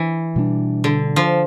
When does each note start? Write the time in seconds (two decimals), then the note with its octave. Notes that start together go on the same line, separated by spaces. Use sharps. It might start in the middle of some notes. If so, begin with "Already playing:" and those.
Already playing: E3
0.36 B2 G3 B3 D4
0.84 D3
1.16 F3